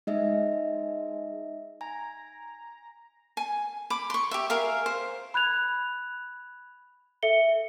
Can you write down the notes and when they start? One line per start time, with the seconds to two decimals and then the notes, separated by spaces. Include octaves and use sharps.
0.07 G#3 D#4 D#5 E5
1.81 G#5 A#5
3.37 G#5
3.90 B5 D6
4.10 C6 C#6
4.31 G4 E5
4.50 G#4 A#4 E5 F5
4.86 C5
5.34 B5 F#6 G#6 F7
7.23 A4 E5 C#7 G7